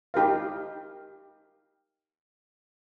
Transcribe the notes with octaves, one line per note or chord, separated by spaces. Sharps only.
D#4 G4 A#4 F5